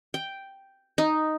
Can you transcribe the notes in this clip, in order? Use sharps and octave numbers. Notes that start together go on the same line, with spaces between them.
G5
D#4